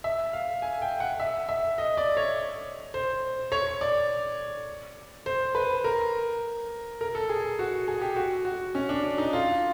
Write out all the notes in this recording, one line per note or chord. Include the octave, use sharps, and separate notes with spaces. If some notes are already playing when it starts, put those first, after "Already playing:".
E5
F5
G#5
G5
F#5
E5
E5
D#5
D5
C#5
C5
C#5
D5
C5
B4
A#4
A#4
A4
G#4
F#4
G#4
G4
F#4
F#4
C#4
D4
D4
D#4
F4